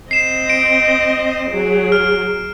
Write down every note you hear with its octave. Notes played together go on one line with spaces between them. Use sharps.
C4 D#5 C7 E7
D7
F#3 G#4
F6